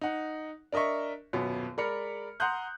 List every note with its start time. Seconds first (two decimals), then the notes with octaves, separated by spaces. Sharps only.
0.01 D#4 F#5
0.73 D4 A#4 D#5 E5 C#6
1.33 D#1 F#2 B2 B3
1.77 G#3 A#4 D5 B5 F6 C#7
2.40 F#5 A#5 C6 D#6 F#6 G6